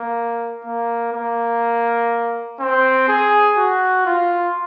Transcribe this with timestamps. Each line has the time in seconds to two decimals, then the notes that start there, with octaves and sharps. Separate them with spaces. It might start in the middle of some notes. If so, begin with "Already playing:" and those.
Already playing: A#3
0.65 A#3
1.13 A#3
2.60 C4
3.08 G#4
3.57 F#4
4.06 F4